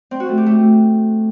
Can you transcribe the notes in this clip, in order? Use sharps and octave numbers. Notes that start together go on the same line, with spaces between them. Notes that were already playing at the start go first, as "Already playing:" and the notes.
C4
F#4
A3
G4
A3